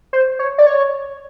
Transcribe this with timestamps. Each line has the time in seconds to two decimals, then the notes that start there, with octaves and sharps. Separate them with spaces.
0.13 C5
0.39 C#5
0.58 D5
0.67 C#5